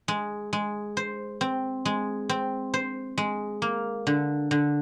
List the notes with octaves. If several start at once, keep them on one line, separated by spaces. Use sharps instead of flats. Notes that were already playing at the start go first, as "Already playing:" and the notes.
G#3
G#3
C5
C4
G#3
C4
C5
G#3
A#3
D3
D3